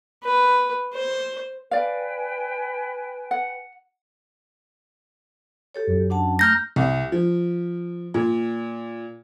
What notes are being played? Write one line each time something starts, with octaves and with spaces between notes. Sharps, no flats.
B4
C5
B4 D5 F5 G5 G#5
F#5
G4 A4 C#5
F#2
D4 F#5 A5
A3 A#5 F6 G6 A#6
C2
F3
A#2